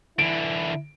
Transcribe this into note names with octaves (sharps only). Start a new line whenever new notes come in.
D3 E3 E4 D7